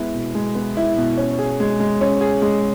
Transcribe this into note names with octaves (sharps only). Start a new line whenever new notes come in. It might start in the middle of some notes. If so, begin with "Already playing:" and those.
Already playing: G#3 B3 E4
B2
G#3
B3
E4
B2
C#4
G#4
G#3
G#3
C#4
G#4
G#3